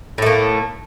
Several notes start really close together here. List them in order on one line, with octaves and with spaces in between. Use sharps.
A2 A3 A#3